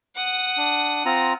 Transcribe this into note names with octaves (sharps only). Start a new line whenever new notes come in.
F#5 D#6
D4
C4 F4 A#5